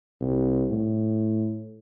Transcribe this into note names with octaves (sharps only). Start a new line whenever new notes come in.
C2
A2